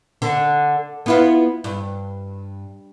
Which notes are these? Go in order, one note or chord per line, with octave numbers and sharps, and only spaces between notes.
D3
B3 E4 F4
G2